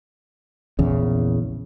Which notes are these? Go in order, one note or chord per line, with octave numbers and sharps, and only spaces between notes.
A#1 E2 C#3